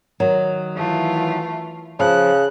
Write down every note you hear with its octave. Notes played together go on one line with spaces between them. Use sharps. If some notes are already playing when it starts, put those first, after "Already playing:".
D#3 F#3
E3 A3 F4
C#3 F3 F#6